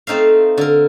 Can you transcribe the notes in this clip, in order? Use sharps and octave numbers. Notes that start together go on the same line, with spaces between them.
A3 C4 D#4 E5 F5
D3 A#4